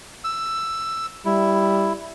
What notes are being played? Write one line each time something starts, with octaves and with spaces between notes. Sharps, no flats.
E6
G3 E4